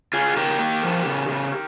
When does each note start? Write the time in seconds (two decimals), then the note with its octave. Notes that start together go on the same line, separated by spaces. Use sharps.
0.13 C#3 F4 G#4
0.36 C#3 G4 A#4
0.59 A#3
0.83 F3
1.06 C#3
1.29 C#3